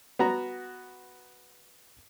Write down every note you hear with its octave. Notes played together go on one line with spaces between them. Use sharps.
B3 F#4 A#5